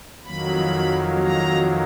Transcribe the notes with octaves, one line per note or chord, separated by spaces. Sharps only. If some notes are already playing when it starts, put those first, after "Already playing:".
F2 D#3 F#3 A#3 B5
A#5